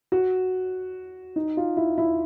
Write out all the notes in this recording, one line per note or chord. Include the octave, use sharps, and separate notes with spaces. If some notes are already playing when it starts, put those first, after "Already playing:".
F#4
D#4
F4
E4
E4